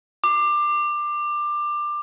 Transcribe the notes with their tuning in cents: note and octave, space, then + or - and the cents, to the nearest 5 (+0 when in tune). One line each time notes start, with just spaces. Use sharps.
D6 +20